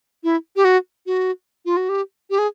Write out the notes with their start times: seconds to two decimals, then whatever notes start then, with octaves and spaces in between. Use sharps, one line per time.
0.24 E4
0.56 G4
0.64 F#4
1.06 F#4
1.65 F4
1.77 F#4
1.89 G4
2.30 G4
2.39 G#4